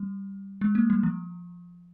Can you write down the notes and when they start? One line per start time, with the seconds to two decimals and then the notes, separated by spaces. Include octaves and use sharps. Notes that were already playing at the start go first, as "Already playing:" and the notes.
Already playing: G3
0.61 G#3
0.75 A#3
0.90 G3
1.03 F3